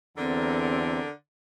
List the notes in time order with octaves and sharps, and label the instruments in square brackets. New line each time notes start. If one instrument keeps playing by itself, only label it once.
[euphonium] E2 [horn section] D3 A4 A#4 [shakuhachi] C4